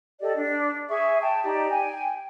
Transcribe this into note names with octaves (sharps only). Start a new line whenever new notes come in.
G4 A4 D5 D#5
D4
G#4 E5 C#6
G5 A5
D#4 G4 D5
G5 G#5